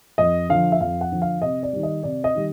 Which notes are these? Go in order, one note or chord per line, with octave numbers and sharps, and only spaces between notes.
F2 D#5
D3 F3 F5
E5
F2 F5
F#5
D3 F3
F5
C3 D#5
D5
D#3 G3
D#5
C3 D5
D#5
D#3 G3